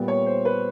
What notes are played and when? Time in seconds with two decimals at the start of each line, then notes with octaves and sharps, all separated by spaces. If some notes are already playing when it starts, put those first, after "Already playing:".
Already playing: A#2 G3 B3
0.08 C#5
0.26 C5
0.45 B4